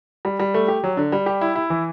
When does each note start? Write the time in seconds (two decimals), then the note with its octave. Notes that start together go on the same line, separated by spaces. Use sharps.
0.25 G3
0.40 G3
0.54 A3
0.68 G4
0.84 F#3
0.97 D3
1.12 G3
1.26 G4
1.41 E4
1.56 E4
1.70 E3